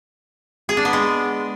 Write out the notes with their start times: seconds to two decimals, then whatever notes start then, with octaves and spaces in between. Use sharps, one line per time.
0.69 G#4
0.77 D4
0.85 B3
0.93 G#3